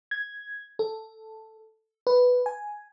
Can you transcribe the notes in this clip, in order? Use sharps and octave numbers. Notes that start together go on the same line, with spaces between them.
G#6
A4
B4
G#5